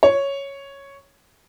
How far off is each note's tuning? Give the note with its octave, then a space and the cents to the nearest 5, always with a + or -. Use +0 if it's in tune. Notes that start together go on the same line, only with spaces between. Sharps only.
C#5 +0